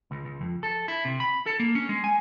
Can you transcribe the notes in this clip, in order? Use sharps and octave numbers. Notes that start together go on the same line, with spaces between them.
C#2
C#2
F2
A4
E4
C3
B5
A4
A#3
C#4
G#3
G#5